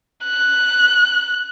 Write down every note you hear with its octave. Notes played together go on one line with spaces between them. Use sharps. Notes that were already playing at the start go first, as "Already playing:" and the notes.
F#6